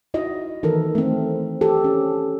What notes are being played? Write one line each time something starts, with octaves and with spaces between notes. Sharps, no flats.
D#4 E4 F#4 D#5
D#3 E3 A4 A#4
A3 C4
G4 A4
C#4